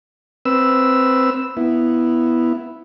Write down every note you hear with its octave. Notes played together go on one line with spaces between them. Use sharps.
C4 B4 E6
B3 E4